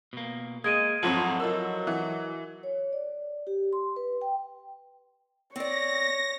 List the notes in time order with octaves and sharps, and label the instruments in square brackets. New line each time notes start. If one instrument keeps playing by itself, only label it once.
[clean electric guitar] B2 A#3
[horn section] G#3 [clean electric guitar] A#3 [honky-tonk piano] D#6 [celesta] G#6 D7 D#7
[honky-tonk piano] F2 G#2 F3 [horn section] F#3 [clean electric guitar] E4 F#4 A4
[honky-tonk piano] F3 E6 [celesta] A#4 D#5
[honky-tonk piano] E3
[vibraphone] C#5
D5
G4
C6
B4
G5
[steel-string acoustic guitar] C4 D5 [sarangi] C#5 [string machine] A#6